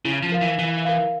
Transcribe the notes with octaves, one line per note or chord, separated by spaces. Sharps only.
C#3 E4
F3
A#4 F5
E3
E3 E4
A#4 F5